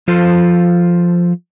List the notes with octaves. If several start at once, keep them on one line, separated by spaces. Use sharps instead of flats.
F3 F4 A4 C5